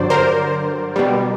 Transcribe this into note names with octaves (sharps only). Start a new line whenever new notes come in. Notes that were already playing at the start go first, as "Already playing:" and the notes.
Already playing: G2 D3 F#3 C5 D5
A#4 C5
B2 G3